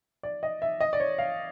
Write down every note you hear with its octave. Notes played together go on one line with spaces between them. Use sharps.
D5
D#5
E5
D#5
D5
C#5
F5